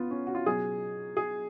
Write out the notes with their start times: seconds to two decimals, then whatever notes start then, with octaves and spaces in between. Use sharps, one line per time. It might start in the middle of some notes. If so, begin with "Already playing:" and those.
Already playing: C#3 B3 F4
0.11 C#4
0.27 F#4
0.35 F4
0.46 B2 F#3 G#4
1.17 G#4